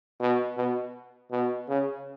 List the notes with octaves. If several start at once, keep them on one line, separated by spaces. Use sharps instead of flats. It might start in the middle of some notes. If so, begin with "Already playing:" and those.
B2
B2
B2
C#3